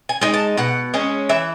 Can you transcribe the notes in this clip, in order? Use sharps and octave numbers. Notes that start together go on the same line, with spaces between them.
G#5
G#3 D#4
A5
B2 F#5
G#3 C#4
E3 E5